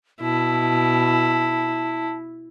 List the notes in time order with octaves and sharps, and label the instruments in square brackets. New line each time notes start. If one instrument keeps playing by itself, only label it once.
[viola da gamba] B2 [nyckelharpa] E4 [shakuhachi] A5